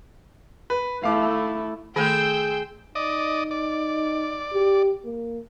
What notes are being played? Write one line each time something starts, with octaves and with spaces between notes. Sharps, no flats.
B4
A3 E4 F5 D6
D#3 A3 G#4 A4 G5 C6 E6 G6
D#4 D5 D#5
D5
G4
A#3